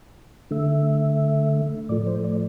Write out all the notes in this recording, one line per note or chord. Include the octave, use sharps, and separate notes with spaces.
D3 A3 E5
A2 F3 A3 D5
C5
D5